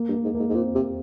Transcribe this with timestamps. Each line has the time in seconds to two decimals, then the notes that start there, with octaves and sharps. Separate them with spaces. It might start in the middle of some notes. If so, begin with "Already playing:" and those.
Already playing: A#3
0.09 G2
0.14 A#3
0.24 G#2
0.35 G#2 A#3
0.49 G#2
0.55 A#2 C4
0.75 C3